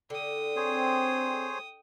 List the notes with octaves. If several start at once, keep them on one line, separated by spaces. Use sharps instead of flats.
D3 G5 D#6
C4 G#4 C5 C#5